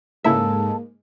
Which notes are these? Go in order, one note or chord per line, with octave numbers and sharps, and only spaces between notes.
G#2 C#3 G#3 A#3 E4 A4 E5